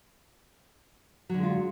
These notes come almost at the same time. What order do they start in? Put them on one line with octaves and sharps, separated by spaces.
F#3 D3 G#3 F4